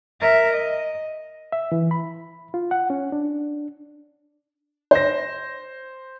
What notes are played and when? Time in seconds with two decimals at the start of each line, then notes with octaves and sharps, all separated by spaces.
0.21 A#4 E5
0.53 D#5
1.52 E5
1.72 E3
1.91 B5
2.54 F4
2.71 F#5
2.90 C#4
3.12 D4
4.91 C5 A#6